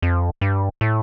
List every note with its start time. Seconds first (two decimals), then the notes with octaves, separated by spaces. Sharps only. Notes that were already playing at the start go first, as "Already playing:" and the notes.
0.02 F2
0.41 G2
0.81 A2